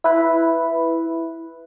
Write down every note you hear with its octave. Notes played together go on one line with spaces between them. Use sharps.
E4 B4